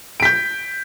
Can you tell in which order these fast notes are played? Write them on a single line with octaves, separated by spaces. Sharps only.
D7 B6 G6